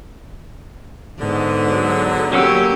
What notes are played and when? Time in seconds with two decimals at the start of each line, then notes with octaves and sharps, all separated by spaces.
1.20 G#2 D3 B3
1.70 F#3
2.33 F#3 A#3 C#4 G4 E6